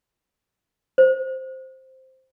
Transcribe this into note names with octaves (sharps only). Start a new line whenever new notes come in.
C5